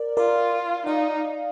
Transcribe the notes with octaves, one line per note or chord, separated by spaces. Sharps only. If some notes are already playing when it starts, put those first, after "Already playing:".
Already playing: A#4 D5
F4 A#4 D5
D#4 D5 F5